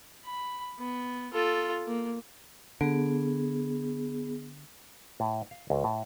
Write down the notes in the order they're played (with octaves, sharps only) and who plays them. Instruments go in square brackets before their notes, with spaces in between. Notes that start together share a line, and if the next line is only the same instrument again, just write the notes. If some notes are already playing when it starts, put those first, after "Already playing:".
[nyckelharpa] B5
B3
F4 A4
A#3
[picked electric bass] D3 [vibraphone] B3 G#4
[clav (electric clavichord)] A2
F5
C#2
A2